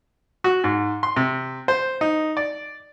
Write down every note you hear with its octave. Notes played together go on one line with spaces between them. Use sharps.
F#4
G#2
C6
C3
C5
D#4
D5